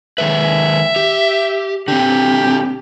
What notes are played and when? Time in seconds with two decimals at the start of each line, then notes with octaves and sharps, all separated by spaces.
0.18 D#3 G#3 B4 E5
0.96 G4
1.88 D3 C4 G4